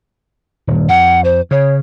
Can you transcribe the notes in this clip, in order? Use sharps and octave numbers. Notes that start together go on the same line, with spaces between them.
D#1 G2
F2 F#5
C5
C#3 C#5